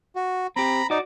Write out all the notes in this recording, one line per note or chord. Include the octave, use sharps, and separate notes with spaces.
F#4
C4 G4 A#5 B5
D#4 F#4 D5